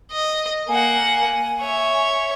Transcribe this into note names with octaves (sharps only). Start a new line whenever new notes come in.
D#5
A#3 F#5 G#5
C#5 E5